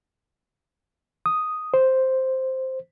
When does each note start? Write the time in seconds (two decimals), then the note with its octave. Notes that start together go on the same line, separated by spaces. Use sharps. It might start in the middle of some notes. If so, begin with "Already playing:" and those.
1.26 D#6
1.74 C5